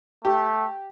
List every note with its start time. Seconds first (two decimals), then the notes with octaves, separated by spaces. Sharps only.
0.25 A3 G4